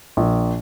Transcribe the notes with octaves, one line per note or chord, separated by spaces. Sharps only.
A#1